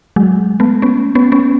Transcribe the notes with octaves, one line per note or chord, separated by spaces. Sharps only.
F#3 G#3
A3 B3
B3 C#4
B3 C#4
B3 C#4